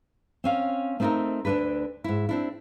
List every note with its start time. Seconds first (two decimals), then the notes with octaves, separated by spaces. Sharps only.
0.44 C4 C#4 F5
1.00 A3 C4 D#4 E4 A4 A#4
1.45 D2 D3 D4 A4 B4
2.04 G#2 E4
2.29 C4 D4 E4